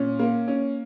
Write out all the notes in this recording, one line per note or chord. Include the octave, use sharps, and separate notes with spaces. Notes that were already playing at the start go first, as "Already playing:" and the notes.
Already playing: A#2 C#4
A#3
C#4